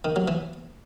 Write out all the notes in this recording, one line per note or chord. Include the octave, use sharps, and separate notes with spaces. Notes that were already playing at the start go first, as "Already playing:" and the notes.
D#3
F#3
E3